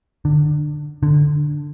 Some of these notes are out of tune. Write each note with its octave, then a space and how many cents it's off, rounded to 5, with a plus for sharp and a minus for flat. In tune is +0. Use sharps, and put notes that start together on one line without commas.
D3 +25
D3 +10